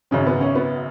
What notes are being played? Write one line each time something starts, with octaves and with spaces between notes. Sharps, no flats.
G#1 F#2 C#3 F#3 C#4
B3
C#4
B3